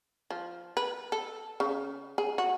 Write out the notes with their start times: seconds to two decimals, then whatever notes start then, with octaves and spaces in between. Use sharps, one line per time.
0.30 F3
0.77 B4
1.12 A4
1.60 C#3
2.18 G#4
2.38 F#4